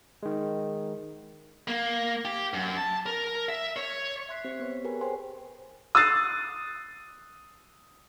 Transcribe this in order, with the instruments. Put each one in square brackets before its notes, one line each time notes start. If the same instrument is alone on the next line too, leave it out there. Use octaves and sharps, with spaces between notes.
[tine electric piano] D#3 G#3
[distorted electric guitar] A#3
G4
F#2
A5
A#4
E5
C#5
[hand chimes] E5 C6 F#6 B6 C7
C4 G4 C5
B3 B4 C#5
G4 G#4 A#4 B4 G#5
C5 C#5 G5 G#5 C6
[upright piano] D#6 E6 F#6 A6 C7